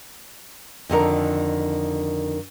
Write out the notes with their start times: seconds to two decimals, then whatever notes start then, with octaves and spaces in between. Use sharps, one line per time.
0.90 F2 D3 D#3 A#4